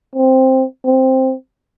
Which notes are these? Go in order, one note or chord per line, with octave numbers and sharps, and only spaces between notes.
C4
C4